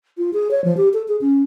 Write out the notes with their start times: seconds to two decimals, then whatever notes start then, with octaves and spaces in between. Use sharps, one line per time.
0.18 F4
0.33 G#4
0.51 C#5
0.64 F3
0.77 G4
0.94 A4
1.08 G#4
1.21 C#4